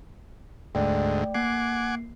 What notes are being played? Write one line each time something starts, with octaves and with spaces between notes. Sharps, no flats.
D2 G#2 A3 D5 G5
A#3 F#5 G#5 D6 C7